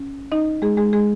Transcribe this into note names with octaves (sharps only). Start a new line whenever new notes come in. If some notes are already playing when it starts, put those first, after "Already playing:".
Already playing: C#4
D#4 D#5
G#3 G#4
G#3 G#4
G#3 G#4